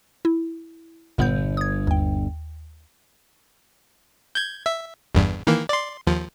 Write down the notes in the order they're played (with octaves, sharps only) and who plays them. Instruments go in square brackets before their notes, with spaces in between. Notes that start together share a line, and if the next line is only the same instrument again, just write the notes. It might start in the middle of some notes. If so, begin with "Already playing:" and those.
[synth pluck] E4
[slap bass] G1 [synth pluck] A#2 B3 G6
[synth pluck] D#6 G#6
D#2 G5
[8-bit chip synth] G6 G#6
E5
G1 E2 G2
D#3 E3 A#3
D5 C6
D#2 F3